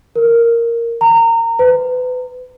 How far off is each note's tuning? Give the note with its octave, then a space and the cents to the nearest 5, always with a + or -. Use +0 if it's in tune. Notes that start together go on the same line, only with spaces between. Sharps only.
A#4 -5
A#5 -25
B4 +30